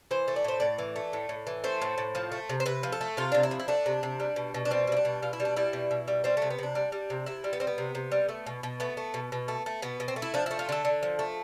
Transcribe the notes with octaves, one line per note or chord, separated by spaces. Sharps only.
E3 C5
A3
D5
A2 C5
A2 D5
E3
A3
A2
A2
E3
A3 C5
A2
A2
F3
A3
C3
C5
C3 B4
F3
A4
A3
C3 F4
C3 D4
E4
F3
E4
A3 D4
C3
C3
G3
B2
B2
D4
G3 C4
G3 E4
D4
B2
B2 F4
E4
G3
D4
G3 E4
B2
B2
G3
G3 C4
C3 A3
B3
C3 D4
G3
G3
C3
C3 E4
G3
B3
G3 C4
B3
C3
C3
G3
A3
B2
B2
A3 B3
A3
B2
B2
A3
A3
B2 B3
B2
C4
A3
E4
F3 D4
A3 E4
F4
D3 A4
D3
F3
A3